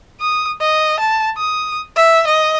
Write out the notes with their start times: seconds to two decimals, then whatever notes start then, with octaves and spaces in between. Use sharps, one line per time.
0.21 D#6
0.61 D#5
0.99 A5
1.38 D#6
1.96 E5
2.27 D#5